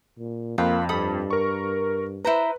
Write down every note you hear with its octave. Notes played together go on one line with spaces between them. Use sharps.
A#2
F2 A#3 F4 B4 G5
G2 A4 B5 D#6
A#4 C#6
E4 B4 C5 A#5